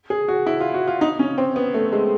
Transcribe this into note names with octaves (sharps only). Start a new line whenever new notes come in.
G#4
F#4
E4
F4
F#4
F4
D#4
C#4
C4
B3
A3
G#3